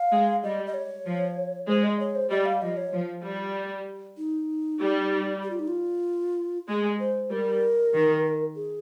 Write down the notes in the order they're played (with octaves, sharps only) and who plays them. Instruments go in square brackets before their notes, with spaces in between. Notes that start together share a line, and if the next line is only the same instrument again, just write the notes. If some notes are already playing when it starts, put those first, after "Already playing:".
Already playing: [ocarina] F5
[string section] G#3
[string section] G3 [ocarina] D#5
[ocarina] D#5
C#5
[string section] F3
[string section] G#3 [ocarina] C5
[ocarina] D#5
C#5
C5
[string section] G3 [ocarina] D#5
[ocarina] F5
[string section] F3 [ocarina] D#5
[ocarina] C#5
[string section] F3
G3
[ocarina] D#4
[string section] G3
[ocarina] G4
F4
D#4
F4
[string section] G#3 [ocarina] G#4
[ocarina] C5
[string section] G3 [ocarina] A#4
[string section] D#3
[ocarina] G#4